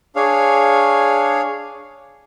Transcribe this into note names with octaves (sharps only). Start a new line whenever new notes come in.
D4 G#4 C#5 F5